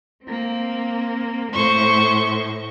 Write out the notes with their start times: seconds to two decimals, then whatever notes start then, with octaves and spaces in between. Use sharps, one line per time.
0.25 A#3 C4
1.52 A2 C5 C#6